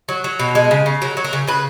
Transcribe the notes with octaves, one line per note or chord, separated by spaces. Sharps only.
F#3
F#3
B2
G#3
C#3
C#3
F#3 A#4
F#3
A#4
C#3
C#3 B4